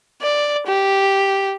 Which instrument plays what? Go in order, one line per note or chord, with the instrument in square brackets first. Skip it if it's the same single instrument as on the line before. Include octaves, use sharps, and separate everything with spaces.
[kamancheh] D5
G4